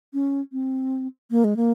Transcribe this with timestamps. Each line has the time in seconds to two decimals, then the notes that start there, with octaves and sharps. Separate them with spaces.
0.14 C#4
0.52 C4
1.31 A#3
1.44 G#3
1.56 A#3